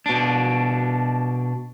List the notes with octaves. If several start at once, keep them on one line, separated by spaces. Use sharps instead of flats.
B2 D4